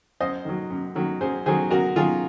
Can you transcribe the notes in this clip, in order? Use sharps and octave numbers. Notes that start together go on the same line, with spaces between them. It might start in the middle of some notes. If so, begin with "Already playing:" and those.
F#2 C5 D#5
D#3 F#3
F#2
D#3 F#3
F#2 G#4 C5
D#3 F#3 G#4 C5
F#2 F#4 A#4
D#3 F#3 F4 G#4